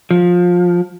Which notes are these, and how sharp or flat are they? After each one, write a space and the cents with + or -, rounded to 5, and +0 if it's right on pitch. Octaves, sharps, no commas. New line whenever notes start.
F3 +20